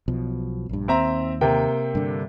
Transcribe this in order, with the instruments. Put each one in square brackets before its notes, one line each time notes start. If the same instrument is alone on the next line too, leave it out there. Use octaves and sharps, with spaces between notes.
[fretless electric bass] B1 B2 F3
A#1 G2
[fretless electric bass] D#2 [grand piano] C4 E5 A#5
[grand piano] C3 A#3 G5
[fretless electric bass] G2 D3